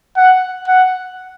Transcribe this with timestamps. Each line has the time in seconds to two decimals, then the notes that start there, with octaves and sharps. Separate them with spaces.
0.17 F#5
0.68 F#5